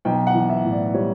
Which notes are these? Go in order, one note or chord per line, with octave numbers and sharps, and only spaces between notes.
B1 G5
F#5
E3
E5
A2
D5
G3 C#5